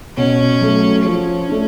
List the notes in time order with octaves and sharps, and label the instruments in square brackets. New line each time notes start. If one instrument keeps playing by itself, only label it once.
[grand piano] B2 [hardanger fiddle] C#4
[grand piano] F#3 A3
[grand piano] F3 [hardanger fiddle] C#4
[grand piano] A3 D4